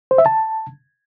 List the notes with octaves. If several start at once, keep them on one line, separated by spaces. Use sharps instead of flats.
C5
E5
A5